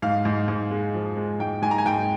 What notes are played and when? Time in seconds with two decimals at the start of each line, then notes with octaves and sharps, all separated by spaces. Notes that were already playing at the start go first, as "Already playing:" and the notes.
0.02 G#2 F5
0.25 G#2
0.48 G#2
0.71 G#3
0.94 F3
1.17 G#3
1.39 G#2 G5
1.62 G#2 G#5
1.71 A#5
1.78 G#5
1.86 G#2 G5